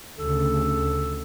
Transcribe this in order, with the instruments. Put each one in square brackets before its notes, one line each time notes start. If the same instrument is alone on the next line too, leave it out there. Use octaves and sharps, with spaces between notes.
[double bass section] D2 C#3 [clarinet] A4